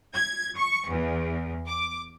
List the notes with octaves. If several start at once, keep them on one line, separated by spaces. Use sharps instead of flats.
G#6
C#6
E2
D6